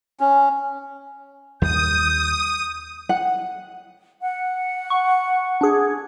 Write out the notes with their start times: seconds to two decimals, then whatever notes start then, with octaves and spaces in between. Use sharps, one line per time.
0.20 C#4
1.62 D#2 G3 D#6 G6
3.09 F#5
4.20 F#5
4.90 C#6
5.61 D4 G#4